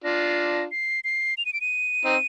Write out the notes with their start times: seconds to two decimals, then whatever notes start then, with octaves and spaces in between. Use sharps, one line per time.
0.04 D4 F4 A#6
0.71 C7
1.04 C7
1.38 F7
1.46 D#7
1.53 D7
1.61 D#7
2.05 C4 D#4